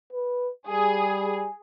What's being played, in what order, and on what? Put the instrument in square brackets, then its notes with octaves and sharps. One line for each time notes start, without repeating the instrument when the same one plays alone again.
[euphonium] B4
[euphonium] G3 [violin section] G#4